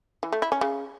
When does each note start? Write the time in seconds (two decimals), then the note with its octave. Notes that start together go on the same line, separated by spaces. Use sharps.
0.23 E3
0.32 A3
0.42 E4
0.52 C#4
0.61 C#3